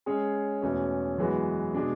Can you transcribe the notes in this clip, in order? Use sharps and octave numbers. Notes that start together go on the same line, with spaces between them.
G#3 C#4 G#4 C#5
E2 B2 A3 C#4
F#2 E3 G#3 B3 F#4
B2 G#3 D4